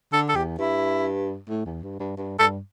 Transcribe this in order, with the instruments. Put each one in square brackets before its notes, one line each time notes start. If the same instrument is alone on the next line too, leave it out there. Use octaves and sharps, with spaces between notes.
[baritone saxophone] D3 [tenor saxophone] A4
[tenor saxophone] A4
[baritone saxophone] E2 [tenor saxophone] G4
[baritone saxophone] G2 [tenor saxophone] E4
[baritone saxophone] A2
E2
G2
G2
G2
[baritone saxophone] G2 [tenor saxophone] A4